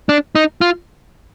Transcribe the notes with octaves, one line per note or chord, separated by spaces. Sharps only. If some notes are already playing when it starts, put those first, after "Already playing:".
D4
D#4
F4